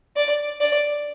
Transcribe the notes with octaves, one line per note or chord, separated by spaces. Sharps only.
D5
D5